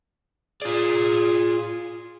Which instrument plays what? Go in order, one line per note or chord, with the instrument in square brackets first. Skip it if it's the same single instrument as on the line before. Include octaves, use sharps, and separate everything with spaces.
[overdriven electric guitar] F4 D5 [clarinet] G#4